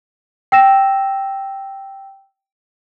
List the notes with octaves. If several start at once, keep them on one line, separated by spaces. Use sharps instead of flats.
G5 E6 A#6 E7